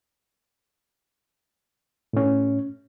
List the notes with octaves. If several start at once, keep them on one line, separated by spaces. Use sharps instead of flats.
A2 C#4